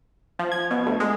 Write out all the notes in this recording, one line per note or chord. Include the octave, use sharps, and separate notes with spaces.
F3
G#6
B2
D2
G#3